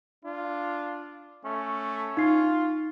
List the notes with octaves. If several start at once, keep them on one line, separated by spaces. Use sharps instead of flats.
D4 F4
A3 C#4
D#4 F4 C7